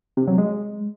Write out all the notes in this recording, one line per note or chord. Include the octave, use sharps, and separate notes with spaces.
C3
F#3
G#3